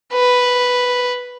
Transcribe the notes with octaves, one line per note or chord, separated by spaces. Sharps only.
B4